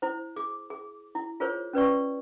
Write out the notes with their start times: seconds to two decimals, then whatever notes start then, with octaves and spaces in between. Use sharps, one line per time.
0.02 E4 C5
0.36 G#4 D6
0.70 G#4
1.15 E4
1.40 F4 G#4 A#4 C5 C#5
1.73 C#4 B4 D5 C#6